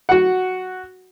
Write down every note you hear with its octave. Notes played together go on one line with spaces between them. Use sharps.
F#4 F#5